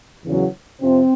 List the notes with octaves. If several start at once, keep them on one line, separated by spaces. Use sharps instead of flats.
E2 C#3 F#3
F2 C3 F3 C4